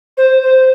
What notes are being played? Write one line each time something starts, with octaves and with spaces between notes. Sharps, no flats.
C5
C5